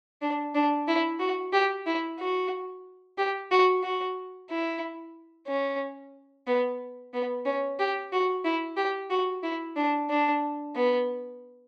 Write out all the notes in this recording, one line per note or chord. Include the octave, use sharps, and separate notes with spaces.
D4
D4
E4
F#4
G4
E4
F#4
G4
F#4
F#4
E4
C#4
B3
B3
C#4
G4
F#4
E4
G4
F#4
E4
D4
D4
B3